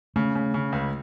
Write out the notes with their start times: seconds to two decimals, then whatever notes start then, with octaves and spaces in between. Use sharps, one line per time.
0.16 C#3 A3
0.35 C#3
0.54 C#3
0.72 C#2